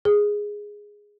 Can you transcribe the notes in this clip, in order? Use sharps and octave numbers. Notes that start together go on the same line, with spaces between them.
G#4